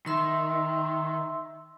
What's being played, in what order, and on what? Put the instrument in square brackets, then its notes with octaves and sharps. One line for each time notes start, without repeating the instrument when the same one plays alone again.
[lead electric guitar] D#3 [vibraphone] E5 C6 E6